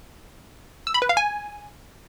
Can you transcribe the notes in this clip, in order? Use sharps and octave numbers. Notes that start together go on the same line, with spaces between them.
E6
B5
B4
F5
G#5